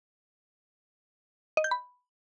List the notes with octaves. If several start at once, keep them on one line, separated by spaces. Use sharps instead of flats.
D#5
G6
B5